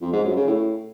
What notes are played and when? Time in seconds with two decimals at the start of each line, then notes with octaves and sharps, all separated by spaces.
0.01 F2
0.13 G#2
0.24 F#2
0.36 C#3
0.47 A2